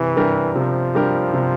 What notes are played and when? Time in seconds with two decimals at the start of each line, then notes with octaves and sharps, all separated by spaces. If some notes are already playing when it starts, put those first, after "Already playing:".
Already playing: C3 E3 G3
0.16 G3 D4 G4 A#4
0.55 C3 F3
0.95 G3 D4 G4 A#4
1.33 C3